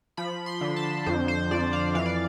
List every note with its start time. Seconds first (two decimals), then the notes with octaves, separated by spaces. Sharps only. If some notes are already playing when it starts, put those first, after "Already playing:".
0.17 F3 B5
0.46 C6
0.61 D3
0.76 A5
1.06 F2 C5
1.28 C5
1.51 F2 D5
1.73 F5
1.95 E3 F5
2.06 D5